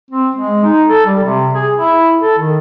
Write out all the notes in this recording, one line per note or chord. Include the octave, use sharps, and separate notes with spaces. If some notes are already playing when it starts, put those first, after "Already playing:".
C4
G#3
D#4
A4
G3
C3
G#4
E4
A4
D#3